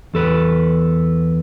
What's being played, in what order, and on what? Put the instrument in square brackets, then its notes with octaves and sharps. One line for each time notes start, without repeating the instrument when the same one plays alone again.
[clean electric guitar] E2 A4 B4